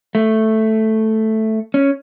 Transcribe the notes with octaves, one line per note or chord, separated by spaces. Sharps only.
A3
C#4